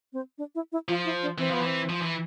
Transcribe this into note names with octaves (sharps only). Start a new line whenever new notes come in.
C4
D4
E4
E4
F3 F4
E4
D4
E3 C4
F3 B3
E3 C4
F3
E3